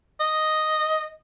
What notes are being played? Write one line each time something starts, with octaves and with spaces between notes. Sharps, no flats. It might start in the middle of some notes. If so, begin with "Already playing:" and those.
D#5